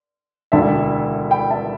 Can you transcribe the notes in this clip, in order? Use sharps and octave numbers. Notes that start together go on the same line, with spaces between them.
E1 D2 D3 E5 A5
G5 B5
E5 A5